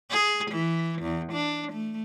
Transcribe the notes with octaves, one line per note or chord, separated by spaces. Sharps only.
G#4
E3
E2
D4
A3